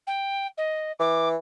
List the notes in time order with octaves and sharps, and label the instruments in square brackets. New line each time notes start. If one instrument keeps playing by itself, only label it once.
[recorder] G5
D#5
[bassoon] E3 [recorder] D6